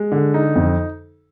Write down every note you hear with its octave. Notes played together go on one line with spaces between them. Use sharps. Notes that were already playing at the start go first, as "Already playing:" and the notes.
Already playing: G#3
D3
D#4
F2